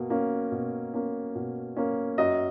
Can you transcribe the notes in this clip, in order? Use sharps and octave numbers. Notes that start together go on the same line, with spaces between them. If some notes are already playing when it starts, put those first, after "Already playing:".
Already playing: B2 A#3
A#3 C#4
B2
A#3 C#4
B2
A#3 C#4
F#2 D#5